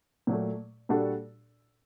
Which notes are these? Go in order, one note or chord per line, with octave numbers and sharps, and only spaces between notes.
A#2 F#3 A3
A#2 G3 D4 F#4 A4